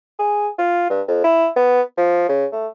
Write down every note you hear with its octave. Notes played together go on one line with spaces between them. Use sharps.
G#4
F4
G2
F2
E4
B3
F3
C#3
A3